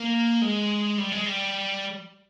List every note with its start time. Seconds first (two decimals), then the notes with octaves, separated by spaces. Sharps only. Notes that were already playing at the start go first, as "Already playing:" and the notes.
Already playing: A#3
0.42 G#3
0.98 G3
1.12 G#3
1.26 G3